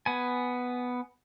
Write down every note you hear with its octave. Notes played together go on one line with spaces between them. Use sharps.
B3 G#5